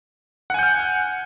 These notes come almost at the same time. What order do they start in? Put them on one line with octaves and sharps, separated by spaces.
F#5 G#5 G6 F6